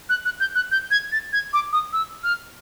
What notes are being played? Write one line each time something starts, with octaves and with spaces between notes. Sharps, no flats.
F#6
F#6
G6
F#6
G6
G#6
A6
G#6
D6
D#6
E6
F6